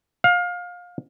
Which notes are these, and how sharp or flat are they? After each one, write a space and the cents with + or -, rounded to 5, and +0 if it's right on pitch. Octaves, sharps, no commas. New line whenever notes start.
F5 +25